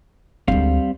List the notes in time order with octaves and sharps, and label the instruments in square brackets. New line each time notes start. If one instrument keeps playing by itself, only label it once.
[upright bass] D2 G#3 [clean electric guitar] G3 C4 F5